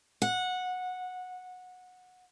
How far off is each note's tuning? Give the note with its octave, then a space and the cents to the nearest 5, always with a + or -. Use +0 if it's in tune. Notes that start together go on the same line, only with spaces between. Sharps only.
F#5 -15